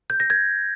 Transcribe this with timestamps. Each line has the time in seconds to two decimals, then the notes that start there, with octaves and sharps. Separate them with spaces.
0.10 G6
0.20 A#6
0.30 G#6